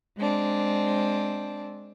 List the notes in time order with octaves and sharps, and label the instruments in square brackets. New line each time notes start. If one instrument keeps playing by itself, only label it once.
[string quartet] G#3 C4 D4